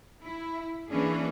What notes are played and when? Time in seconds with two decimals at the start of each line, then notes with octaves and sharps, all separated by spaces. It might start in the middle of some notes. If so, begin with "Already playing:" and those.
0.24 E4
0.89 E3 A#3 C#4 D4 G#4